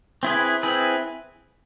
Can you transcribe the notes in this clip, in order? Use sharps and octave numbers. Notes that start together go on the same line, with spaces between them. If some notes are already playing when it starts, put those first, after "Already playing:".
C4 E4 G#4 B4
C4 E4 G#4 B4